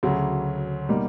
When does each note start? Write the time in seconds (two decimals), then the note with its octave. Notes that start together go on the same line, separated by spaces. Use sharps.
0.03 D2 C#3 F#3
0.89 B2 G3 A#3 D#4